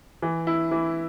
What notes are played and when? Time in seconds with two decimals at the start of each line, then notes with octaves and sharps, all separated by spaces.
0.22 E3
0.47 E4
0.71 E3